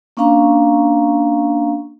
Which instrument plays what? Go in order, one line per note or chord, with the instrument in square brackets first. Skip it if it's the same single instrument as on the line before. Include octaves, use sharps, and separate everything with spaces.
[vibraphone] A#3 C#4 D4 F5 A#5 C#6